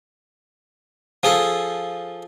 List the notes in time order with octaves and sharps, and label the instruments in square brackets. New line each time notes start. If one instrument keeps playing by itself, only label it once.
[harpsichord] F3 G#4 A4